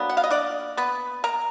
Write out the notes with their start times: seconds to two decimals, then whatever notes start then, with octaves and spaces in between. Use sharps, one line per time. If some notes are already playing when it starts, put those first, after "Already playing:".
Already playing: F#3 A#3 B3 D4
0.09 F#5
0.17 F5
0.24 D#5
0.30 D4 D5
0.77 B3 B4
1.24 A#4 A#5